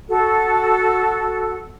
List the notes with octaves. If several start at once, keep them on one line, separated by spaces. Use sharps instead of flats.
F#4 A4